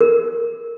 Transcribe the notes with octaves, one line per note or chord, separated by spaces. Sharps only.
A#4